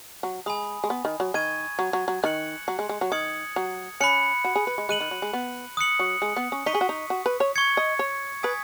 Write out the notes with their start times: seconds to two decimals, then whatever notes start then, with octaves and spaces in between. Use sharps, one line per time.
0.23 F#3
0.46 G#3 G#5 B5 D#6
0.84 G#3
0.90 B3
1.05 D#3
1.20 F#3
1.34 D#3 C#6 G#6 D#7
1.79 F#3
1.93 F#3
2.08 F#3
2.23 D#3 F#6 C#7 F#7
2.68 F#3
2.79 G#3
2.89 G#3
3.01 F#3
3.12 D#3 D#6 G#6 C#7 F#7
3.56 F#3
4.00 C#4 B5 F#6 C#7 F#7
4.44 F#4
4.56 G#4
4.67 B4
4.78 G#3
4.89 G#3 F#6 D#7 F#7
5.01 D#3
5.11 F#3
5.22 G#3
5.33 B3
5.77 D#6 F#6 C#7 F#7
5.99 F#3
6.22 G#3
6.36 B3
6.52 C#4
6.66 D#4 C#6 B6 D#7
6.74 G#4
6.81 F#4
6.89 D#4
7.10 F#4
7.26 B4
7.40 C#5
7.56 C#6 G#6 C#7
7.77 D#5
7.99 C#5
8.43 B4 G#5 D#6 G#6 B6